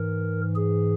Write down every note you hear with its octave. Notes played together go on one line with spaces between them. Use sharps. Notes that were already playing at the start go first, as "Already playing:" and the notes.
Already playing: G#2 E3 A#4
G#4